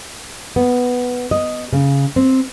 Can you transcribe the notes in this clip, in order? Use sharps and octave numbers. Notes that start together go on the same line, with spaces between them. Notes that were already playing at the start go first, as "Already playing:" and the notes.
B3
D#5
C#3
C4